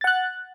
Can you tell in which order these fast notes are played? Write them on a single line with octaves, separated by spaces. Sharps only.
A6 F#5 F#6